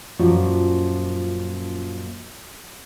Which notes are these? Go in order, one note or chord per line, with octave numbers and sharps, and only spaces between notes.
F#2 A#2 F3 C#4 F4 F#4